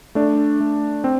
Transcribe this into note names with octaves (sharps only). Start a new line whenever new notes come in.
A3 D4
A3
C4